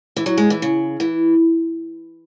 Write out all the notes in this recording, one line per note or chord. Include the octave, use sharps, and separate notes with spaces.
E3
F#3
G#3
E3
C#3
E3